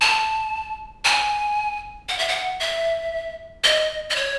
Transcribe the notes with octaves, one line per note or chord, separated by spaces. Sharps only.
A5
G#5
F#5
E5
F#5
E5
D#5
D#5
C#5